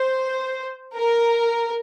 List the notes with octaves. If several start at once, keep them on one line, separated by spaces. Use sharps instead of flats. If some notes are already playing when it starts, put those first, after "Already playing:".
Already playing: C5
A#4